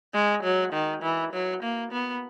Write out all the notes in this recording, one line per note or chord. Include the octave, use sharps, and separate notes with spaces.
G#3
F#3
D#3
E3
F#3
A#3
B3